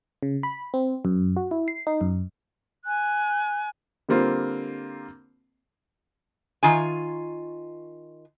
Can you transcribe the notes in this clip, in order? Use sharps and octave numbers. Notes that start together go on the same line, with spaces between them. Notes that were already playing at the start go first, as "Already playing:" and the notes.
C#3
B5
C4
F#2
F#4
E4
C7
D#4
F#2
G#5 F#6
D3 G3 A#3 C4 F4
D#3 F4 G#5